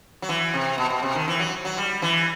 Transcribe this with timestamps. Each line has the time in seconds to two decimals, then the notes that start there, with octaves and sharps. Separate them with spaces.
0.22 F#3
0.29 E3
0.54 C3
0.78 B2
0.90 B2
1.03 C3
1.15 D#3
1.28 E3
1.39 F#3
1.65 F#3
1.77 G3
2.02 E3